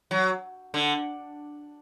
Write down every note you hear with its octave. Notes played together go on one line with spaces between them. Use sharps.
F#3
D3